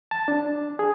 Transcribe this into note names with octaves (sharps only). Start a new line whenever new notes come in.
A5
D4
G#4